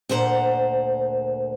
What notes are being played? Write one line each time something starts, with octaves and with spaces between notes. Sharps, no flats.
D2 A#2 C5 F#5 A#5